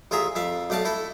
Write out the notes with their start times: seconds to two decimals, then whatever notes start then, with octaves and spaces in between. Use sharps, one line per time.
0.11 A1 F4 G#4 E5 A#5
0.35 F2 E5 F5
0.70 B1 A3 D5 F5 A5
0.85 A3 E4 A4